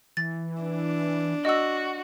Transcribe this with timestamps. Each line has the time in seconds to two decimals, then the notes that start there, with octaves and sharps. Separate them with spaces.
0.17 E3 A6
0.61 D4
1.45 F#4 D#5 E6